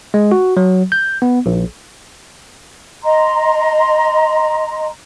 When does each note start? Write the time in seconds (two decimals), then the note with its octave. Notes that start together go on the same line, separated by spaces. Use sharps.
0.14 G#3
0.32 F#4
0.57 F#3
0.92 G6
1.22 B3
1.46 A#1
3.04 D#5 A#5 C6